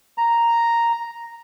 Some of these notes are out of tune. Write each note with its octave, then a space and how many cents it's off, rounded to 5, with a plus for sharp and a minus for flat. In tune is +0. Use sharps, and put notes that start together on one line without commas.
A#5 +0